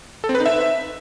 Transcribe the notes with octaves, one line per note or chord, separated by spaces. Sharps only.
A4
C4
B4
D#4
E5